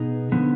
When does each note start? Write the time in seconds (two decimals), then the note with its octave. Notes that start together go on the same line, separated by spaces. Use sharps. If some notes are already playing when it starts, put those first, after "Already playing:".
Already playing: B2 B3 D#4 G#4
0.32 D3 F3 B3